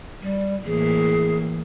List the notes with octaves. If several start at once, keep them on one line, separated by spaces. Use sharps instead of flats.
G3
A2 E3 A#3 G#4